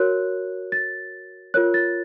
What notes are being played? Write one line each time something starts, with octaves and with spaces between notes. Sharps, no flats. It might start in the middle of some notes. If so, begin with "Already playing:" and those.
Already playing: F#4 A#4 C#5 F#6
A6
F4 A#4 C#5 F#6
A6